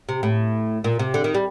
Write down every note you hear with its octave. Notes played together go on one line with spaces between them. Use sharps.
C3
A2
A#2
C3
D3
D#3
G3